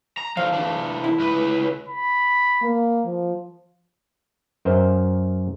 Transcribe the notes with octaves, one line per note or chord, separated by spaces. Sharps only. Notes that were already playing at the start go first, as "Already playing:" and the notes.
A#5
D3 F3 F5
E3 D4
E4
C#2 B4
B5
A#3
F3
F#2 A#4 C5